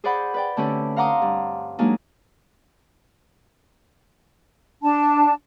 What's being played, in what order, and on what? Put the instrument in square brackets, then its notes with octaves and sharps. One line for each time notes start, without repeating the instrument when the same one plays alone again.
[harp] G#4 C5 D5 F#5 B5 G6
B4 D5 G5
D3 A3 C4 C#4 G4 B4
F5 F#5 A#5 C6 D6 D#6
G2
F#3 G#3 A#3 D4 D#4
[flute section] D4 A5